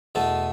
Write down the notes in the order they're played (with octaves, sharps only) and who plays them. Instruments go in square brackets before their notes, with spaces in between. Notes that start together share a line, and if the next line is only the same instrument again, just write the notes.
[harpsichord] E2 B2 A3 A5